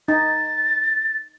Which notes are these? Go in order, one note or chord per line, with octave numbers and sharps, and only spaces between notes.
D#4 A6